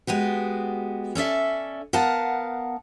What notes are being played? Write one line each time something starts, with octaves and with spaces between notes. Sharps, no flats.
G#3 B3 F#4 G4
C#4 A4 D5 E5
B3 A#4 F5 F#5 A5